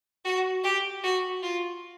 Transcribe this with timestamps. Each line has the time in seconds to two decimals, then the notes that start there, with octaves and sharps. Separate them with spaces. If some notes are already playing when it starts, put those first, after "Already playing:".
0.25 F#4
0.64 G4
1.03 F#4
1.42 F4